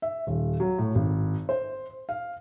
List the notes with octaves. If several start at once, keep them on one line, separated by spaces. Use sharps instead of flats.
E5
D#1
F#3
A2
G#1
C5
F5